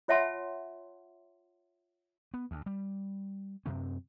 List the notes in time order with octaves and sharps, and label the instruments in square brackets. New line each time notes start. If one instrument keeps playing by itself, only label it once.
[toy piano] F4 C#5 E5 F#5 A5 C6
[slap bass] B3
D2
G3
F#2 C3 C4